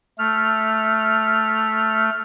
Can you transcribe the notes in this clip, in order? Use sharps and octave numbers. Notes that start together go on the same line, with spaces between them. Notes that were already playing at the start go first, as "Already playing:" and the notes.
A3 F6